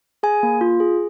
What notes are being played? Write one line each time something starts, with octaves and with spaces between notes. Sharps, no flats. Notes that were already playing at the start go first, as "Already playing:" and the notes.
G#4 G#5
A#3
F4
G#4